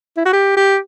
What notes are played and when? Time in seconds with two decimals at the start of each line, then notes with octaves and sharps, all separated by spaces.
0.17 E4
0.25 F#4
0.33 G4
0.57 G4